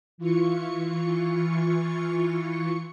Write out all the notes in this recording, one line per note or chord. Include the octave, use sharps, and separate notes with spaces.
E3 F4 C#6 C#7